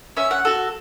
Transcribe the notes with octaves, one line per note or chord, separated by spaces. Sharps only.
C#4 E5
F#5
F#4 A4